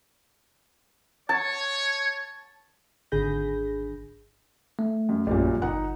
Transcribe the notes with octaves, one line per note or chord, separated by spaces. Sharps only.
C#5 A5
G#1 D3 G#4 B5 G6 A#6
A3
F#2
A#1 F#2 A#2 F#3 G3
G1 D#4 F#5